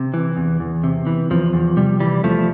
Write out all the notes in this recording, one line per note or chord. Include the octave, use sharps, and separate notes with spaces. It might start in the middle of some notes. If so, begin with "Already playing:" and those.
Already playing: C3
E3
E2
E2
C3
E3
E2 F3
E2
C3 G3
E3 G3
E2 F3 A3